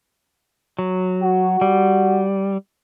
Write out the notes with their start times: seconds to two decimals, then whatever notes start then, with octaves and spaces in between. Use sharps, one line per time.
0.79 F#3
1.22 F#4
1.61 G3